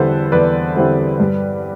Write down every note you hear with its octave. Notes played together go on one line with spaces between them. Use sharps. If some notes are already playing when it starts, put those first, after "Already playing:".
Already playing: E2 D3 G3 C4 E4 A4 B4 C5
E2 B4 D5
D3 G3 C4 E4
G2